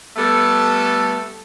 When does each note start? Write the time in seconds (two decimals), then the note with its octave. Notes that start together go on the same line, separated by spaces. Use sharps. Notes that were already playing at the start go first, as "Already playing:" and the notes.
0.16 G3 A3 B3 A4